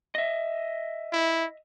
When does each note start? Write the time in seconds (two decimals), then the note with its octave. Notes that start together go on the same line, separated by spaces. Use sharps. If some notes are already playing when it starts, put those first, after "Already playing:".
0.15 D#5 E5
1.13 E4